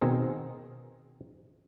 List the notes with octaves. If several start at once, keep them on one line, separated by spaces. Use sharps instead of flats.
B2 D#3 C4 G#4 A#4